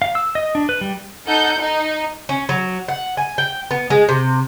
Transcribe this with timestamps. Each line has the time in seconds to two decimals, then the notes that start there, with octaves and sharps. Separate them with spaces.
0.02 F5
0.15 E6
0.35 D#5
0.55 D4
0.69 B4
0.81 G3
1.26 D#4 A4 F#5 G6
1.58 D#4
2.29 C#4
2.49 F#3
2.88 F#5
3.17 G#5
3.38 G5
3.71 B3
3.90 G#3
4.09 C3